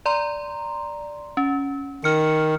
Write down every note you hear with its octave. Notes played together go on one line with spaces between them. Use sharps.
D5 A#5 C6
C#4
D#3 F6 C#7